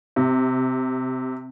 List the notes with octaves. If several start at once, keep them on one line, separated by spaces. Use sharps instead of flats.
C3